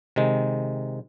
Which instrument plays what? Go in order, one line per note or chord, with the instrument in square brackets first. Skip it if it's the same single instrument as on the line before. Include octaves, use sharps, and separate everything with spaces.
[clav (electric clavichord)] C3 D#3 G#3